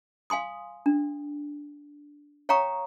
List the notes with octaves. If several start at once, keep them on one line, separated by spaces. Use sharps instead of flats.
F5 G#5 C6 D#6
D4
C#5 F5 G5 A#5 C#6 D#6